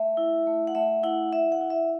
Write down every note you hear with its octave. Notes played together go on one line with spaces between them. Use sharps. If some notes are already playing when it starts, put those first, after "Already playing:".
Already playing: A3 E5
E4
A3
F#5
A3 E5
E4 F#5
E4 E5
F#5
E4
E5